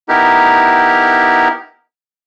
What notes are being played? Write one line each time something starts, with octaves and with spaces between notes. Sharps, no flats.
B3 D#4 E4 G4 A#4